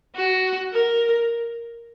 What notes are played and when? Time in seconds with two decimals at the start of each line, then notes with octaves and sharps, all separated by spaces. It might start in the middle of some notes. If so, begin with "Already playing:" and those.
0.16 F#4
0.73 A#4